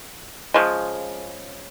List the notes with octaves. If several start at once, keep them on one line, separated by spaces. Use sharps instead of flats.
C#3 F3 G#3